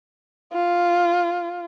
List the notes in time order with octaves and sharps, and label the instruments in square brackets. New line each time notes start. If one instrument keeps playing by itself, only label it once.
[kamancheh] F4